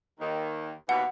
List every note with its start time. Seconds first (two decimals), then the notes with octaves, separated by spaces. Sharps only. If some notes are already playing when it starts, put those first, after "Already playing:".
0.20 D#2 D#3
0.89 D#2 B2 E3 F#5